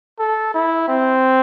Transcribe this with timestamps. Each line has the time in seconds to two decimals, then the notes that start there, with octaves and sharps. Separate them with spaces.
0.19 A4
0.54 E4
0.88 C4